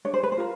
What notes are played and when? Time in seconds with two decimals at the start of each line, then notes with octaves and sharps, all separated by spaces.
0.05 D4 C#5
0.14 C5
0.23 B4
0.32 C5
0.38 F4 A#4